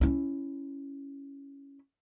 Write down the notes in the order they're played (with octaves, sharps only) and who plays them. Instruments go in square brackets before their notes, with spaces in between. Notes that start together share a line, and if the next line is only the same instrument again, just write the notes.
[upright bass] C#4 E4